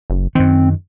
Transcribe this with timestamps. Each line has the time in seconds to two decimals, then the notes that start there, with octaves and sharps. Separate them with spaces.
0.10 F#1
0.35 F#2 D#3 C4